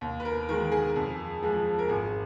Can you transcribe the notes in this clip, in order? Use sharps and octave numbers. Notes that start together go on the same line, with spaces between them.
D#2
B4
A#4
D#3 G#3 A#4
G#4
F2
F3 G#3
A#4
G#1 G#4